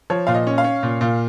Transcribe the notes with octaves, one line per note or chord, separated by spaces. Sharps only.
F3 C#5
A#2 F5
D#5
C#4
F5
C#4
A#2
A#2